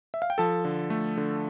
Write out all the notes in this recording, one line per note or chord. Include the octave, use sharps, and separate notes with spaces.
E5
F5
G5
F3 A4 A5
D3
A3
D3